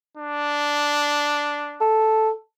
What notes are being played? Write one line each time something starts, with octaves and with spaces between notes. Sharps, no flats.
D4
A4